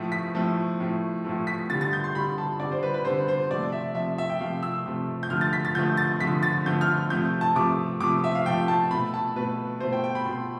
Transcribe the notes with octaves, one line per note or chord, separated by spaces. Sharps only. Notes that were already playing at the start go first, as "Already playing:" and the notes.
Already playing: A2 F3 A3
B6
A2 F3 A3
A2 F3 A3
A2 F3 A3
B6
D3 G3 A6
A6
G6
C6
D3 G3 B5
A5
D3 G3 D5
C5
B4
B4
D3 G3 C5
C5
C3 F3 A3 D5
E5
C3 F3 A3 E5
E5
G5
C3 F3 A3 F5
E6
C3 F3 A3
G6
D3 F3 A3 F6
A6
B6
A6
D3 F3 A3 G6
A6
D3 F3 A3 B6
A6
D3 F3 A3 G6
F6
C3 F3 A3 G6
A5
C3 F3 A3 D6
C3 F3 A3 D6
E5
F5
C3 F3 A3 G5
A5
B2 A3 B5
A5
B2 A3 B4
B2 A3 C5
G5
G5
B5
B2 A3 C6